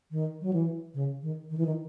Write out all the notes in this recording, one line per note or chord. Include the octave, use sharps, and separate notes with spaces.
D#3
F#3
E3
C#3
D#3
D#3
E3
D#3